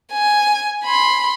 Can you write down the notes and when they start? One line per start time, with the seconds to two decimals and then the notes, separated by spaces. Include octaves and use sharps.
0.12 G#5
0.85 B5 C6